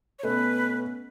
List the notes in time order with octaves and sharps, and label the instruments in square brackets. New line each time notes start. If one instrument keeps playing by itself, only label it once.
[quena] C#5
[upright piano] B2 A3 C#4 [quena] B4